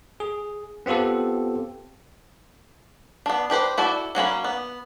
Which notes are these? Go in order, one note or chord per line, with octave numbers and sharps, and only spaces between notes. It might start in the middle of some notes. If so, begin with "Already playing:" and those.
G#4
B3 C4 F4 G4 A4
B3 D4
D4 G4 B4 C5
E4 F#4 A4 D5
F#3 A#3 C#4 B5
B3